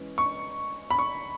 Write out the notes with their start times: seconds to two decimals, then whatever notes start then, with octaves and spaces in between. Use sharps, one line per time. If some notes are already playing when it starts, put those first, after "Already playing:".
Already playing: E3 G#3 C#4
0.18 C#6
0.91 B5
0.99 C#6